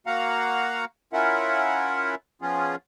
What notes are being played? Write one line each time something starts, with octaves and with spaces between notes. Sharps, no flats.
A#3 F#4 F5 F#5 A#5
C#4 E4 F4 A#4 E5 F#5
F3 B3 C#4 F4 G#4